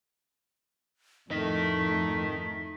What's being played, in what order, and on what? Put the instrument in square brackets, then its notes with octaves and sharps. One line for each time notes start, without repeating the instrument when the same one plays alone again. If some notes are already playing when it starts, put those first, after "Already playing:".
[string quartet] F2 A2 [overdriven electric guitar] D#3 D#4 [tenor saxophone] A3 [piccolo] B6